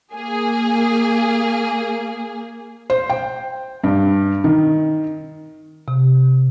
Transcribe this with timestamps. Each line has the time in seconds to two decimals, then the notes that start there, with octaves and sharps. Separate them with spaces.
0.12 A#3 G#4
2.90 C5
3.10 G5
3.84 G2
4.44 D#3
5.88 C3